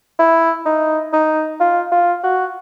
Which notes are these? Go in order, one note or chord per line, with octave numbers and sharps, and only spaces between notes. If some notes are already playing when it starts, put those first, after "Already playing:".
E4
D#4
D#4
F4
F4
F#4